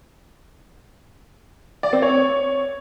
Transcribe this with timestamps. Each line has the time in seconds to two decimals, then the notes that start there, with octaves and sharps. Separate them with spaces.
1.83 D5
1.93 C4
2.02 C#5